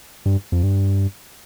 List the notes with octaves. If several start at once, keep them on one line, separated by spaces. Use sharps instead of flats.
G2
F2
G2